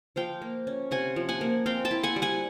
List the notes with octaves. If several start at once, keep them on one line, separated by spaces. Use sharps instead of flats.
F3 F5 G5
A#3
C#4
C3 F#5 G#5
F3
F#5 G#5
A#3
C4 F5 G5
G5 A5
E4
F#5 G#5
G3
F#5 G#5